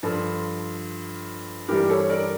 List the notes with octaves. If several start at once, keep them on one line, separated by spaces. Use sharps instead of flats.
G2 F3 F4 A4
G2 E3 G3 G4 A#4
A4 C#5
C#5
A#4 D5